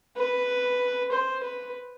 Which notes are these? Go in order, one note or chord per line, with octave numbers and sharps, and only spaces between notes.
B4
C5
B4